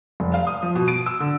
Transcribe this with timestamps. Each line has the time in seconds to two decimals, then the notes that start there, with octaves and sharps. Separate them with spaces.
0.20 F1
0.34 F5
0.47 D#6
0.63 F3
0.75 B2
0.88 D7
1.06 E6
1.20 D3